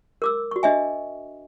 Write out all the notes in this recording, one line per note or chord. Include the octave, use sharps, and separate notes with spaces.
A#4 D6 E6
F#4 C#6
D4 D#5 E5 G#5